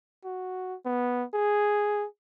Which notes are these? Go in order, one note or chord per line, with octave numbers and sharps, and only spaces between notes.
F#4
B3
G#4